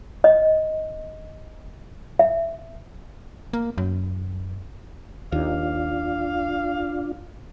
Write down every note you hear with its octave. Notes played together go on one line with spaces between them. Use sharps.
D#5
E5
A#3
F#2
D#2 D4 F4 F5